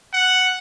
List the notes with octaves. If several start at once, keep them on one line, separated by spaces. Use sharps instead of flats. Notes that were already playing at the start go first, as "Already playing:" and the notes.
F#5